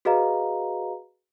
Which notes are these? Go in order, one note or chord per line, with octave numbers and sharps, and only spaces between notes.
F#4 G#4 B4 D#5 F5 A#5